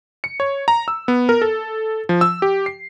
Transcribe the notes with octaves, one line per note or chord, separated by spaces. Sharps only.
C#7
C#5
A#5
E6
B3
A#4
A4
F3
E6
G4
C7